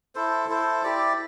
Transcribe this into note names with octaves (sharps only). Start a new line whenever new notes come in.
E4 A4 C5
E4 A4 C5
E4 G4 D5